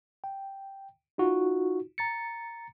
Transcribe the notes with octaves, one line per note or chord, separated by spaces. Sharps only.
G5
D#4 F4 F#4
A#5 A6 C#7